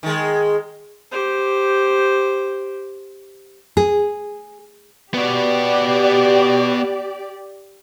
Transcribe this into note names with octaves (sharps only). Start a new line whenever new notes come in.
D#3 G#3
G4 C5
G#4
B3 F#4 G4 D5